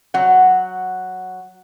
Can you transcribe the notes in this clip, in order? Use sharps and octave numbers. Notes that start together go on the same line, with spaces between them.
F#3 F#5